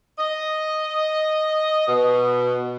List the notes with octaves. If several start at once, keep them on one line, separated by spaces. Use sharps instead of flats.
D#5
B2